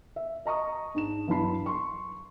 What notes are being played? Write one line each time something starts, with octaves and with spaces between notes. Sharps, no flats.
E5
D#5 A#5 C#6 D#6
G#2 D4 E7
G2 F#3 E4 A5 B5 C7
C6 C#6